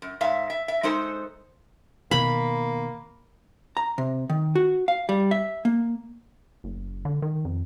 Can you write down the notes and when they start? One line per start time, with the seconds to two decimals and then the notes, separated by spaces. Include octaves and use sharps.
0.02 F#2
0.21 G#2 E5 F5
0.50 E5
0.68 E5
0.83 G#3 D#4 A4 C5
2.11 B2 D#3 A#3 B5
3.77 A#5
3.98 C3
4.29 D#3
4.55 F#4
4.88 F5
5.09 G3
5.31 E5
5.65 A#3
6.64 F#1
7.05 D3
7.22 D#3
7.45 F2